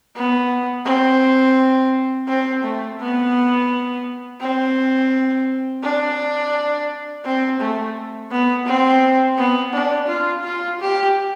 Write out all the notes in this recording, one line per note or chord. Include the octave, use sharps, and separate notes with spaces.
B3
C4
C4
A3
B3
C4
D4
C4
A3
B3
C4
B3
D4
F4
F4
G4